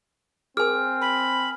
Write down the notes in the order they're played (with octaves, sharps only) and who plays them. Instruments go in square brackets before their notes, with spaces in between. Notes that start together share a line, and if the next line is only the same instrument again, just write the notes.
[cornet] C4 [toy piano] G#4 A#4 D#6 [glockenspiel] G#5 F6
[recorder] B5